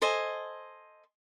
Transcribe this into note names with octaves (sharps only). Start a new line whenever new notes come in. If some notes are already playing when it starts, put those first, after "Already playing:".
A4 C5 D#5 G#5